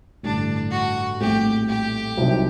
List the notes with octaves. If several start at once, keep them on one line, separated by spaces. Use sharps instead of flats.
A1 G2 D3 D4
F#4
A#1 A2 G3 C4 G4
G4
C2 C3 F#3 C4 D#4